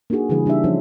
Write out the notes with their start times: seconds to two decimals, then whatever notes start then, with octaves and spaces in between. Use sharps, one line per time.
0.10 A#3 D4 D#4 F#4 G#4
0.29 C#3 E3 G3 D4 G#4 B4
0.46 G3 D4 D#4 G4 E5
0.64 F3 C#4 D#4 E4 C5